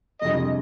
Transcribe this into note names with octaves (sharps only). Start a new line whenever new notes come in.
F2 C3 G3 D4 G#4 D#5